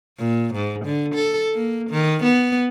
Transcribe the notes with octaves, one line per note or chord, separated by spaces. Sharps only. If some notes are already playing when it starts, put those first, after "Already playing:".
A#2
G#2
D3
A4
A#3
D#3
B3